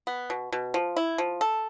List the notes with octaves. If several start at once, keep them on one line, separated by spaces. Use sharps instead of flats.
B3
B2
B2
F3
E4
F3
A4